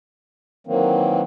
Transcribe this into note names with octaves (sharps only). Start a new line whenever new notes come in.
D#3 E3 F#3 A#3 C4